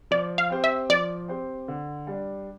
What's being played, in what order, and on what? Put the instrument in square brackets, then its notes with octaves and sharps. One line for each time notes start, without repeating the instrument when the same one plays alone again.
[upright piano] F3 [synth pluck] D5
[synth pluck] F5
[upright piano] C4 G4 C5
[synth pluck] E5
[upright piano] F3 [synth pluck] D5
[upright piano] C4 G4 C5
D3
G3 D4